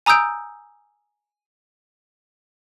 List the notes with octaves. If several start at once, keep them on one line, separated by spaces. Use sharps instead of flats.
G#5 A#5 D#6 E6 G6 D7